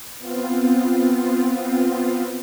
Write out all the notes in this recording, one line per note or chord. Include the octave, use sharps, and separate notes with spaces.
B3 C4 F4